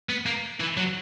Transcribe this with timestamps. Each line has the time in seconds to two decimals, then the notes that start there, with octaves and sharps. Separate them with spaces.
0.09 B3
0.26 A#3
0.60 E3
0.77 F#3